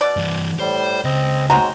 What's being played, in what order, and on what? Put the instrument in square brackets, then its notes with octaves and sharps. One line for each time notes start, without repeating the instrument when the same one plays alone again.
[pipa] B2 D5
[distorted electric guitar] G2 E3
[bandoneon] A2 G3 [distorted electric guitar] C5
[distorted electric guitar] C#2 [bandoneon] C4 D#5
[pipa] F#3 G#3 C4 [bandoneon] F#4 [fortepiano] A#5